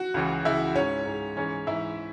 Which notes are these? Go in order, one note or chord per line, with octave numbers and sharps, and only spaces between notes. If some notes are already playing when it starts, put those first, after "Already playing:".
Already playing: F#4 F#5
C#2 C#3 E3
C#2 C#3 E3 E4 E5
G#2 G#3 C#4 C#5
G#2 G#3
G#2 E3 G#3 C#4 C#5
G#2 E3 G#3 E4 E5